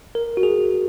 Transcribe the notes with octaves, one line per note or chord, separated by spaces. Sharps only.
A#4
F#4
G#4